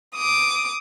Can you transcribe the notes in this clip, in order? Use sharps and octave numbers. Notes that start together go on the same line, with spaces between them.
D6 D#6